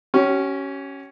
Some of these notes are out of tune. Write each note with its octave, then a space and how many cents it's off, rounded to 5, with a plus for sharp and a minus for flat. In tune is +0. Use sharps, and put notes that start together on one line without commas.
C#4 +0 G4 -45